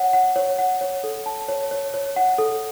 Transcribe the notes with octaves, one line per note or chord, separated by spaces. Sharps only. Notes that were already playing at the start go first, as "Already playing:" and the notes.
Already playing: C#5 F#5
F#5
C#5
F#5
C#5
A4
A5
C#5
C#5
C#5
F#5
A4